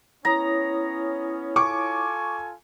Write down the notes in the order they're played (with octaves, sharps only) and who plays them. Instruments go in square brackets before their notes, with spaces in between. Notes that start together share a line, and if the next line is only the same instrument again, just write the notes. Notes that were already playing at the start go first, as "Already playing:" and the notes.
[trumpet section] B3 C#4 [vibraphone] E4 C#5 D#6 [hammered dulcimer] A#5
[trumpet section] F4 A4 G#5 [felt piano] C#6 D6